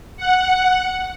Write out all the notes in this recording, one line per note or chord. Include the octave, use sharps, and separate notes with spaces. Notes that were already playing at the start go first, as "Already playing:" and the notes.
F#5